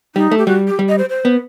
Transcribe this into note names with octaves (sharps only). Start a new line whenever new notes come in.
G3 D#4
A3
G4
G3 F#4
G4
G3
D#5
C5
C5
B3